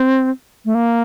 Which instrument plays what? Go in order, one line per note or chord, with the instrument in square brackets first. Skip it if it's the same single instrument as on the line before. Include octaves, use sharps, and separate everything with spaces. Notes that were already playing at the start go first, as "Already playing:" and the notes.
Already playing: [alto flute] C4
A3
A#3